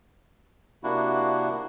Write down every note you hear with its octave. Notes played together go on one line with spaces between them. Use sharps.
C3 A#3 D4 E4 F#4